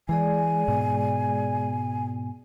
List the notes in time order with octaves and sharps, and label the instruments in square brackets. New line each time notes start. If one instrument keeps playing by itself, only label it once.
[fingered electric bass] E3 [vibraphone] G#3 G#4 D5 [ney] G#5
[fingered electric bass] G#2 B2